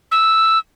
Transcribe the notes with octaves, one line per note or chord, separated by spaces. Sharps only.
E6